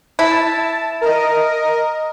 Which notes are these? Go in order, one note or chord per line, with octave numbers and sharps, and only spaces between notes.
E4 A5
A#4 D#5